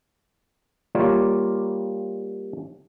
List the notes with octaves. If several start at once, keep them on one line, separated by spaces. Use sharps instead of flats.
G3 A#3 F4 C#5 D5